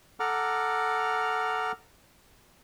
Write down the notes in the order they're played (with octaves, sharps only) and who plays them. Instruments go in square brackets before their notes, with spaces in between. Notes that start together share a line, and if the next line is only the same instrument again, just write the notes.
[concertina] A4 F#5 A#5 D6 F6